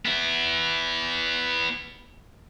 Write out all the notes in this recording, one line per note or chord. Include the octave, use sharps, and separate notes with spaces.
B3 E4